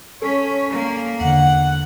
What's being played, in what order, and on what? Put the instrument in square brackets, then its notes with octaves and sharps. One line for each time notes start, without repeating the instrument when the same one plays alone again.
[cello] C#4 C#5 [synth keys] A4 B6
[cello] A#3
[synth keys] E2 D3 [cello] F#5